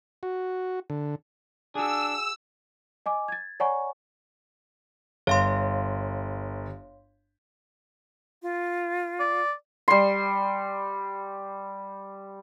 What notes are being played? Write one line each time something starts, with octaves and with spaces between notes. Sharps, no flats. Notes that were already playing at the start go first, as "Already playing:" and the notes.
F#4
D3
D4 F#4 G#4 E6
D#5 G#5 D6
G#6 A6
C#5 D5 F#5 G#5 A#5 C#6
G1 C#5 F5 C6
F4
D5
G3 C6